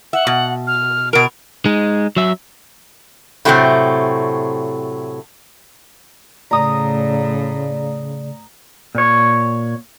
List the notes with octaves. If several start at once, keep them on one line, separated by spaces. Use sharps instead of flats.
E5 F#5
B2
F6
B2 A#4 D7
G#3 D#4
F#3 E5
A2 C3 F#3 A3 A#3 C4
A2 C#3 A3 D5 A#5 D#6
A#2 C#5